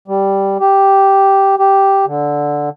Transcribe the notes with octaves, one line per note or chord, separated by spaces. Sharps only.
G3
G4
G4
D3